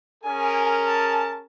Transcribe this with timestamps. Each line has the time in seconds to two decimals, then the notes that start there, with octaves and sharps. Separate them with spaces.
0.24 C#4 G#4 A#4 G#5
0.87 A5